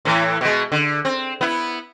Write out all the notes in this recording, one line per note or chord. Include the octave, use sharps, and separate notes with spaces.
A2 E3
B2 G#3
D3
C4
B3 E4